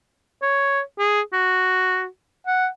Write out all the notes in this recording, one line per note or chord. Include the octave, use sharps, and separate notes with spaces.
C#5
G#4
F#4
F#5